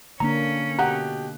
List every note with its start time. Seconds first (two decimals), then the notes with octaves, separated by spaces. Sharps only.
0.20 D3 A#3 C#4 D4 A#5
0.79 B2 G4 F#5 A#5 F#6